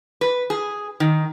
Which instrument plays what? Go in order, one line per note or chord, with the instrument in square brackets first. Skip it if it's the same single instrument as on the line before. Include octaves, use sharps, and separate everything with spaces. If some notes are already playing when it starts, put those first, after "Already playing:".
[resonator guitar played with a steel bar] B4
G#4
D#3